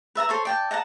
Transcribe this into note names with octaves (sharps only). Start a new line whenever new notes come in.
B4 E5 A5 A#5
A4 C5 C#5
D5 G5 A5
D#5 F#5 A5 A#5